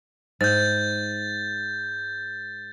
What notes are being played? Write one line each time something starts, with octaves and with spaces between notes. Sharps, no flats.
G#2 G6 A6